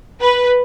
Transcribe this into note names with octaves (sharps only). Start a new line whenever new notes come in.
B4